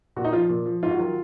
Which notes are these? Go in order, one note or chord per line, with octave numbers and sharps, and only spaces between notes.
A#2 F#4
D#4
F3 F4
A#2
F3
G#2 F4
F#4
D#3 F#3 F4